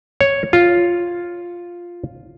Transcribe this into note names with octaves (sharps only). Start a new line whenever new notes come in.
C#5
F4